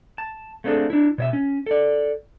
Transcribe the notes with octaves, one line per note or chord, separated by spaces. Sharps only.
A5
A3 A#3 C4 D4 G#4 A4
D4 E4
B2 C#5 E5
C#4
A4 D5